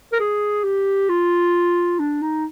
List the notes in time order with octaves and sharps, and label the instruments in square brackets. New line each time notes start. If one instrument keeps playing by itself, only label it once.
[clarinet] A#4
G#4
G4
F4
D4
D#4